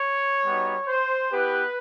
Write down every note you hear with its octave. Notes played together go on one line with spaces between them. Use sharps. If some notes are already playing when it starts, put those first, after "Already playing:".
Already playing: C#5
G3 B3 D#4 F#4
C5
B3 E4 G4 B4